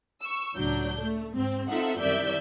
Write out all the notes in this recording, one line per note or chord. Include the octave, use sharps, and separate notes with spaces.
C#6 E6
C#2 A2 F#3 D4 G6
A3
G#2 C4
C4 D#4 F4 A4 E5 F#5
C2 F#2 D#3 D5 E5 G6